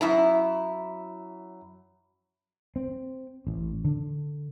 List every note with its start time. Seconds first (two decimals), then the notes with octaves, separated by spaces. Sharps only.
0.01 F#2 E4 A#5
2.76 C4
3.47 A1
3.85 D3